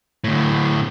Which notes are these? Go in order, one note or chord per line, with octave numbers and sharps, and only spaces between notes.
D2 A2